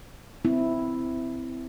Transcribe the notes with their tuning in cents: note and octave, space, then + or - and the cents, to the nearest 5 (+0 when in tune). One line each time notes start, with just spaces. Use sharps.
C4 -20 E4 +0